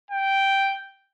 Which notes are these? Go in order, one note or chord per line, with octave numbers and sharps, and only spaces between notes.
G5